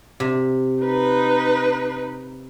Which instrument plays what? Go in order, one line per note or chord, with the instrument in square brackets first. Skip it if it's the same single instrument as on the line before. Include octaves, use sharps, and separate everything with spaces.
[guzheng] C3
[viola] D#4 B4